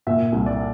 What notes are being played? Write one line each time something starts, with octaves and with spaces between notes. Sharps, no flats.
A#2 E5
C2
D5